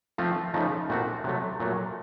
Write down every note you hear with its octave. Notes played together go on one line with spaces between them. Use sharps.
F3 A3 C4 F4
C#3 F3 A3 D#4
A#2 A3 C4 F#4
C3 F#3 A3
A#2 F#3 A3